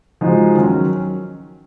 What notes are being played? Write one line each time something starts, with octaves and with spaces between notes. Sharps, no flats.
F3 G#3 D#4 F#4
D#3 F#3 C#4